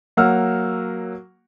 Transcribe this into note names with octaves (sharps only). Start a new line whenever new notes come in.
F#3 A#3 F#5 E6 F6